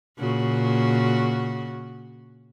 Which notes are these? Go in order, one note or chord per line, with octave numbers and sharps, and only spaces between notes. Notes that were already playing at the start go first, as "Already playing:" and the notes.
A#2 C#3 F#4